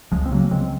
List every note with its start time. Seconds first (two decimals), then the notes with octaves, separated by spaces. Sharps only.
0.12 C#2 F3 G#3
0.26 C4
0.31 C#3 F#3 A#3
0.51 C#3 G#3 C4